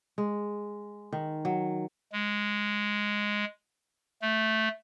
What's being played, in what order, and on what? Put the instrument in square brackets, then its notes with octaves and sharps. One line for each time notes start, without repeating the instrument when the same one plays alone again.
[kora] G#3
D#3
F#3
[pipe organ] G#3
A3